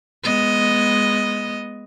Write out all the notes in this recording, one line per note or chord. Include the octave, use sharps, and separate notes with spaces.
G#3 B3 D#5